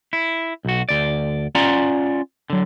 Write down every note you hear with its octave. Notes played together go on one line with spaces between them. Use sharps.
E4
B1 F#4
D2 D5
C#4 F4 D5 F#5 A#5
D3 F#3